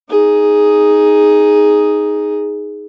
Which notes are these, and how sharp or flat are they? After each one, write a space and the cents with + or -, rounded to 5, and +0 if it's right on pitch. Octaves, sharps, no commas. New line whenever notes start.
D#4 +0 G#4 +0